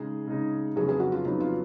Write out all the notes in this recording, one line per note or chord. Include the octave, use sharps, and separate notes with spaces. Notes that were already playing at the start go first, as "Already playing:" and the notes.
Already playing: C#3 G#3 D#4 G#4
C#3 G#3 D#4
F2 C#3 F#3 B3 G#4
G#4
F#4
F4
F2 C#3 F#3 B3 D#4
F4